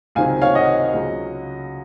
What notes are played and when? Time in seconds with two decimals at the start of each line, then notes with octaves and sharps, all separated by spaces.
0.15 C#2 C3 D#3 F#3 C4 F5 G#5
0.41 C#5 F5
0.55 D#5 F#5
0.93 C#2 C#3 F#3